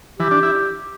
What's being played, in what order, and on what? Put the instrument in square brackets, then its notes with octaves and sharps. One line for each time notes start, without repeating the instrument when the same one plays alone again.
[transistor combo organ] E3 [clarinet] G4
[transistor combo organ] D4
E4